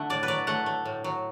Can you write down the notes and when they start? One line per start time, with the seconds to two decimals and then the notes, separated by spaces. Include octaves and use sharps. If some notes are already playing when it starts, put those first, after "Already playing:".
Already playing: D3 A3 E5 F#5
0.10 A2 D5
0.23 B4
0.28 F#3 D5
0.47 A3 F#5
0.66 A3
0.85 A2
1.04 F#3